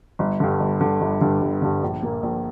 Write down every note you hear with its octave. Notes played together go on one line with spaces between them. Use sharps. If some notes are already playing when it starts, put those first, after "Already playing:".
G1
G2 D3
G1
G2 D3
G1
G2 D3
G1
G2 D3
A#1
A#2 A#3
A#1